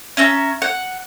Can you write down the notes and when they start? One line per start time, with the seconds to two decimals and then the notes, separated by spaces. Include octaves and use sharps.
0.17 C#4 E5 A#5
0.62 F#5